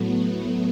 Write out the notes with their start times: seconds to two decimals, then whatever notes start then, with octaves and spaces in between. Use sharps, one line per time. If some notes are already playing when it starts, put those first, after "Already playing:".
Already playing: A2 F#3 A3 B3
0.12 B3